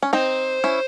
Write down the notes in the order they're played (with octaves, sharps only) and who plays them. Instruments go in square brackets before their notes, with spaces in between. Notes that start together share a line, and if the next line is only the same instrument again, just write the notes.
[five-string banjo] C#4
[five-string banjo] C4 D#4 [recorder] C5
[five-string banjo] C#4 E4